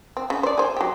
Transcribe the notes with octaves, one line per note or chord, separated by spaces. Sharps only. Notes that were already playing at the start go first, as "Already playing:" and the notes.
C4
C#3
C5 D5
G#4 C5
F#3 G4